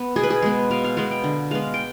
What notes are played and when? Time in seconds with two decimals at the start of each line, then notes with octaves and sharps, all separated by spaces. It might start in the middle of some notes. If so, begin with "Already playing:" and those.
Already playing: B3
0.16 B2 G#4
0.23 B4
0.30 G#4
0.42 G#3 B3
0.71 B2 F5
0.84 F5
0.97 G#3 B3 F5
1.11 G5
1.24 D3
1.51 G#3 B3 F5
1.74 G5